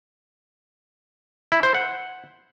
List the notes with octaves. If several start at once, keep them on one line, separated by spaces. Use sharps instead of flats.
E4
C5
F#5